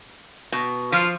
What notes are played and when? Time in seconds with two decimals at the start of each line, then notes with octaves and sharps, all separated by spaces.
0.52 B2
0.92 F3 F4